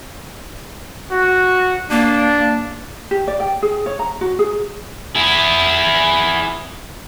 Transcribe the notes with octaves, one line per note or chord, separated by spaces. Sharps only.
F#4
A#3 D4
G4
D5
G5
G#4
C#5
A#5
F#4
G#4
E4 G#4